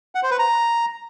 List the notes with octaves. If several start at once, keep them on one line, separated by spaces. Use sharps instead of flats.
F#5
C5
B4
A#5